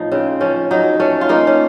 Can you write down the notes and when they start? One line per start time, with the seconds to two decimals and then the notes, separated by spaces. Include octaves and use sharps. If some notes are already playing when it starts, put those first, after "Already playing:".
Already playing: A2 F3 D#4
0.12 C#3 C4
0.41 F3 C#4
0.71 F#3 D#4
1.00 A3 C#4
1.21 F4
1.29 A#3 D#4
1.47 C#4